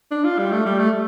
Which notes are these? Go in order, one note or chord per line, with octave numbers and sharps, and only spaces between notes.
D4
F4
G3
A3
G3
A3